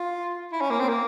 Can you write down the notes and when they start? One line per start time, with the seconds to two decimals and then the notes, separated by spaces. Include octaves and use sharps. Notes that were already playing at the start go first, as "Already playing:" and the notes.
Already playing: F4
0.52 E4
0.61 C#4
0.71 A#3
0.80 C4
0.89 A#3